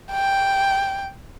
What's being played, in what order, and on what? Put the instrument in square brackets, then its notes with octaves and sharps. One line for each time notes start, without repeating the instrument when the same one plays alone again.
[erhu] G5